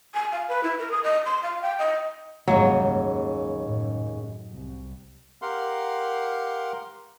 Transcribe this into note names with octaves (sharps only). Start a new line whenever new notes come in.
G#5
F5
B4
E4
A#4
D#6
D#5
C6
F5
G5
D#5
F#1 D#2 G#2 C#3 F#3 G3
F#2 A2
C2
G4 A#4 F5 F#5 C6